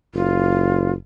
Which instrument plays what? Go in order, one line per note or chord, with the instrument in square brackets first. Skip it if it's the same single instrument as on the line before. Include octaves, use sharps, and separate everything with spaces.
[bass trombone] F#1 [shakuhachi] F4